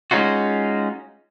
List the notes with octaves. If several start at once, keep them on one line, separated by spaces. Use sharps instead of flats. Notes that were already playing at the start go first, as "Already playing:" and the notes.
G#3 C#4 D#4 F4 F#4